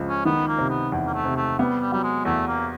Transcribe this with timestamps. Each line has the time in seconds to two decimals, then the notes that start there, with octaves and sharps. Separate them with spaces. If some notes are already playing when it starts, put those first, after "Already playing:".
Already playing: C#2 F3
0.08 C#4
0.25 D#3 B3
0.48 A#3
0.59 C3
0.70 B3
0.92 E2
1.07 A#3
1.14 A3
1.25 C3
1.36 A3
1.59 G3 B3
1.81 G3
1.92 F#3 G3
2.03 G#3
2.25 E2 A3
2.48 A#3